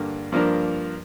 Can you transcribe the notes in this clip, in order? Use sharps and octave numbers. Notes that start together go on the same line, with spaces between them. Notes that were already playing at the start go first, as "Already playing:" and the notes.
Already playing: G2 D3 A#3
G2 F3 A#3 D4 A#4